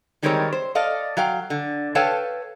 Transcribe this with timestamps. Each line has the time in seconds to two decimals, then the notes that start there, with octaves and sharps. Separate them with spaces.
0.23 D#3 G3 G#3 C4 A#4 C#5
0.53 C5
0.75 A4 D5 D#5 F5
1.17 F#3 F5 G5
1.50 D3
1.95 A4 B4 C#5 F5 G5 A5